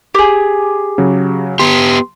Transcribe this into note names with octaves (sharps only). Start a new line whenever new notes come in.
G4 G#4
C#3 F#3
B3 G4 C6